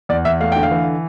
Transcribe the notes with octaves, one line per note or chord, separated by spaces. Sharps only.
E2 D5
E2 E5
A3 F5
D3 G5
F5
E3